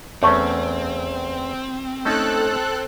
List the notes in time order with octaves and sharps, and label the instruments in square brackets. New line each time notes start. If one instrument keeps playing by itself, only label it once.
[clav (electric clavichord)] E2 A3 C#4 [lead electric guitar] C4 [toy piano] C#5 A5 C#6
[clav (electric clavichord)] A3 C#4 D#4 [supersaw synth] A4 F#6